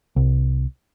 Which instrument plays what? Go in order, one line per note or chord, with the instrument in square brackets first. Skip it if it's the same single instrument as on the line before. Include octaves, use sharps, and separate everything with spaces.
[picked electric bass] C2